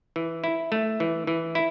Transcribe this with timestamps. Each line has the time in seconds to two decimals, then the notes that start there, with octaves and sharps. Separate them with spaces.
0.16 E3
0.44 E4
0.72 A3
1.00 E3
1.27 E3
1.55 E4